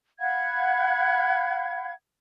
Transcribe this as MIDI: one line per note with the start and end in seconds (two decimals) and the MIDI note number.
0.19 1.91 77
0.19 1.91 78
0.19 1.91 83
0.19 1.91 92